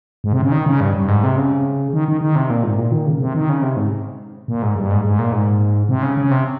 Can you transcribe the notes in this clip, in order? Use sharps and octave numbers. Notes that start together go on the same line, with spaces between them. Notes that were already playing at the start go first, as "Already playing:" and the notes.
G#2
C3
C#3
D#3
C#3
G2
G2
G#2
C3
C#3
D#3
D#3
D#3
C3
A#2
G#2
A#2
D#3
C#3
C3
D#3
C#3
C3
G#2
A#2
G#2
G2
G#2
G#2
A#2
G#2
C3
C#3
C#3
C3